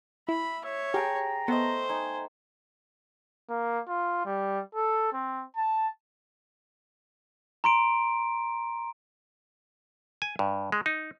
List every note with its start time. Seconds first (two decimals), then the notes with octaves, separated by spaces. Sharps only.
0.29 E4 E5 B5
0.65 C#5 E5
0.94 G4 G#4 G5 A5 A#5
1.48 A3 B3 C5 D#5
1.90 D#4 G#5
3.50 A#3
3.88 F4
4.25 G3
4.75 A4
5.13 C4
5.56 A5
7.64 A#5 C6 D7
10.22 G#5
10.39 G2
10.72 G#3
10.86 D#4